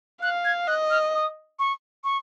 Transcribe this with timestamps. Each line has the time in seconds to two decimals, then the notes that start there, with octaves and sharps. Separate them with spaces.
0.22 F5 F#6
0.45 G#6
0.67 D#5 F#6
0.90 F6
1.13 D#6
1.59 C#6
2.04 C#6